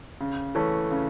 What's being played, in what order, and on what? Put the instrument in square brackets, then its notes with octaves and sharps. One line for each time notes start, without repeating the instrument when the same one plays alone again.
[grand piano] C#3
E3 A3 C#4
C#3